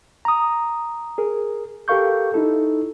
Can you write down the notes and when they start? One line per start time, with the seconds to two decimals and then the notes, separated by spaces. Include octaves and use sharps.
0.25 A#5 D#6
1.18 G#4 A#4
1.88 G4 A4 A#4 F5 C#6 G6
2.34 D#4 E4 A4